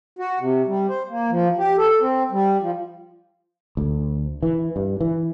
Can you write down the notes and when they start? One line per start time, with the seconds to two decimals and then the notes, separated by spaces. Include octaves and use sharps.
0.19 F#4
0.40 C3
0.67 G3
0.89 C5
1.10 A#3
1.30 F3
1.58 G4
1.78 A4
2.00 C4
2.32 G3
2.61 F3
3.77 D2
4.43 E3
4.76 G2
5.01 E3